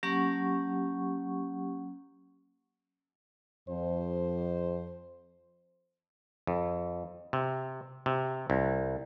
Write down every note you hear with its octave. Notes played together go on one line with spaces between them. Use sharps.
F#3 A#3 C#4 G4 F#5 C#6
F2 C5
F2
C3
C3
C2